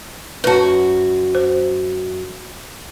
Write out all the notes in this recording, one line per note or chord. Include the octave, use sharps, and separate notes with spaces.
F#2 F#4 B4 A5
C5